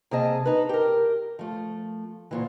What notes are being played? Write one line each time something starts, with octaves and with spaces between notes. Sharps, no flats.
C3 A#3 G#4 D#5 A5
D#4 B4
G4 A#4
F3 A3
D2 A#2 E3